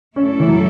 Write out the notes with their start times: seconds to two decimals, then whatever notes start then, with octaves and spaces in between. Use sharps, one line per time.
0.16 F#2 D3 A3 C#4 E4 A4
0.40 E3
0.48 F#3